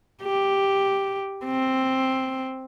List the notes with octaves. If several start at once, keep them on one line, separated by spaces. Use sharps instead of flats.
G4
C4